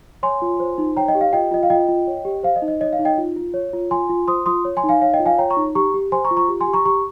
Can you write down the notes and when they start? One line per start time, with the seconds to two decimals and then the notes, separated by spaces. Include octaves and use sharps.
0.23 C#5 G#5 C6
0.42 F4
0.60 C5
0.78 D#4
0.96 C#5 G5 A#5
1.08 D#5 G5
1.15 G4
1.21 F5
1.33 F4 D#5 G5
1.51 F4 D#5
1.63 F5
1.70 F4 D#5 G5
1.88 F4
2.07 C#5
2.25 G4
2.43 C5 F5
2.56 D#5
2.62 D#4
2.68 D#5
2.81 C#5 D#5
2.93 F5
2.99 D#4
3.05 D#5 G5
3.18 F4
3.36 F4
3.54 C#5
3.73 F4
3.91 F4 G#5 C6
4.09 F4
4.28 C5 C6 D#6
4.46 F4 C6 D#6
4.65 C#5
4.77 G#5 C6
4.84 D#4
4.89 F5 G#5
5.02 C#5 F5
5.14 D#5 G5
5.19 F4
5.26 F5 G#5
5.38 C#5 G5 A#5
5.50 A#5 C#6
5.56 D#4
5.75 G4 A#5 C#6
5.94 G4
6.12 C5 G#5 C6
6.25 A#5 C#6
6.31 F4
6.37 A#5 C#6
6.48 G4
6.61 G#5 C6
6.68 G4
6.73 A#5 C#6
6.85 G4 A#5 C#6